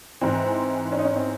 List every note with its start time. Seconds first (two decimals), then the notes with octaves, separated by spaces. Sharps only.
0.21 G#2 E3 C4
0.92 C#4
0.98 D#4
1.05 C#4
1.16 C4